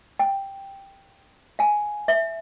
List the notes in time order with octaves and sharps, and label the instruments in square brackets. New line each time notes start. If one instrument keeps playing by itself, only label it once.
[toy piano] G5
F5 G#5
E5